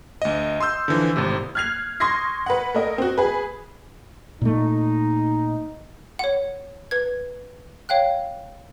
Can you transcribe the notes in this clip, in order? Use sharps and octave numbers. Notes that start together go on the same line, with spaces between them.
D2 D#5
C6 D#6 E6 G6
D3 E3 F3
G#1 A2 C3
F6 F#6 G#6 C7 F7
C6 C#6 D#6 G#6 A#6 C7
B4 F#5
A3 A#4 D#5
C4 F#4
G#4 B4
A#2 A3 D#4
C#5 F#5
B4 G#6
C#5 F5 G5 F#6